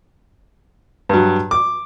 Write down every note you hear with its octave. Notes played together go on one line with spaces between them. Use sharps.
G2 F#3
D6